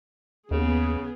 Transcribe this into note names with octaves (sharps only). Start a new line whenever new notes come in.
D#2 C#3 B3 G#4